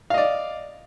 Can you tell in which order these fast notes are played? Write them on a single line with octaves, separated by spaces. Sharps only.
F5 D#5 D5